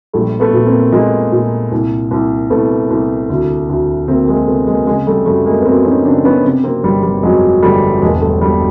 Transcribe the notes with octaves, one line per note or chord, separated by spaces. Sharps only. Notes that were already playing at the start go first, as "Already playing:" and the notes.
A#1 G3 A3
A3 B3
A#2
A#3 C4
A#2 G#3 A#3
A#2
C2
C2
C2 A3 B3
C2
D2
D2
D2 A#3 C4
G#3 A#3
C3 A3 B3
G#3 A#3
C#3 G#3 A#3
G3 A3
F#2 G3 A3
G#3 A#3
B3
F#2 A#3 C4
C#4 D#4
C#3 C4 D4
B3 C#4
C3
A#3 C4
G1 G3
G3
F2 F#3 G#3
G1 G3 A3
E1 G#3 A#3
G3 A3
B2 G3